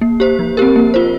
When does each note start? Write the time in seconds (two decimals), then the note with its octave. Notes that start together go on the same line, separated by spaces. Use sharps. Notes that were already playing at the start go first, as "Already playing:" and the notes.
0.01 A#3
0.20 G4 C5
0.39 F3
0.57 C4 G4 A#4
0.76 A#3
0.94 F4 C5